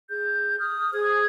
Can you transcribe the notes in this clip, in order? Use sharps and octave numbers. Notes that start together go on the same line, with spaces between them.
G#4 G6
D#6 F6
G#4 C5 D#6 G#6